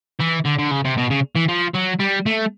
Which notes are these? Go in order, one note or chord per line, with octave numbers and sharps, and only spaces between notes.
E3
D3
D3
C#3
C3
B2
C#3
E3
F3
F#3
G3
A3